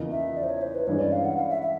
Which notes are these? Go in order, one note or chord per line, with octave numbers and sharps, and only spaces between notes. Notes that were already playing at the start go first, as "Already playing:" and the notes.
Already playing: E2 C#3 F3 A#3 D#4
E5
D5
C5
C#5
C5
B4
G2 E3 G#3 C#4 C#5
D5
F5
F#5
F5
E5
E5